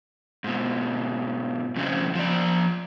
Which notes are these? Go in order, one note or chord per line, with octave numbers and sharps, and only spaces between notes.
G#2 B2
F2 C#3 F3
F3 D5